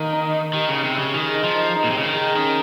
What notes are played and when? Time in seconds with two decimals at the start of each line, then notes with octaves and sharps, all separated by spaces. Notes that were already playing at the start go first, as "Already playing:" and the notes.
Already playing: D#3 A#3
0.13 D#4
0.33 D#4
0.54 D#3 G4
0.69 C#3
0.74 D#4
0.84 C3
0.95 C#3 D#4
1.14 D#3 G#4
1.34 D#4
1.44 F3
1.55 D#4
1.75 D#4
1.84 A#2
1.90 C3
1.95 C#3 C5
2.05 D#3
2.16 G#4
2.36 D#3 C#4